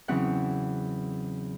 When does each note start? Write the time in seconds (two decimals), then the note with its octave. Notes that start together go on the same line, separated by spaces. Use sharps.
0.08 E2 C#3 E3 F#3 C4 F#5